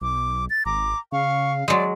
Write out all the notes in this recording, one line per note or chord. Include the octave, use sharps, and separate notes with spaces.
B1 D6
A6
G#1 A#5 D6
C#3 F5 C#6
F#3 G#3 D5